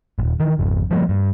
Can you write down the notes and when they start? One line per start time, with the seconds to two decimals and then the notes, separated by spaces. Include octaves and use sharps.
0.19 D#1 G#1
0.40 D#3 E3
0.59 G#1 F2
0.91 F3 G3 G#3 A#3
1.09 G2